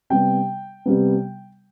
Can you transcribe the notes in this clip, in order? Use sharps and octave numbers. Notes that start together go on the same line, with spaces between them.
C3 G3 B3 G5
C3 G3 B3